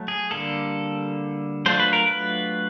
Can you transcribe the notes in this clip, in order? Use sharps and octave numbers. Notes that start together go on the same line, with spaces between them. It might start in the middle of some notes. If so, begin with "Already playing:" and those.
Already playing: F#3 A3
G#4
D3 G3 A#3 A4
F#3 A3 D4 F4 C5
B4
A#4
B4